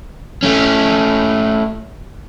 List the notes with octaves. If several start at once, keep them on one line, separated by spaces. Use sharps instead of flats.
A3 C#4